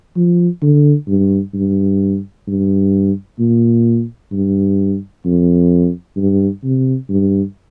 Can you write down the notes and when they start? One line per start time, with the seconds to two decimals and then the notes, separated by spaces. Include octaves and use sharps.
0.16 F3
0.62 D3
1.08 G2
1.54 G2
2.47 G2
3.39 A#2
4.32 G2
5.25 F2
6.16 G2
6.64 C3
7.09 G2